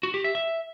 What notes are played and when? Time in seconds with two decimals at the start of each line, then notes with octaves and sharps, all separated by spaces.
0.03 F#4
0.14 G4
0.24 E5
0.35 E5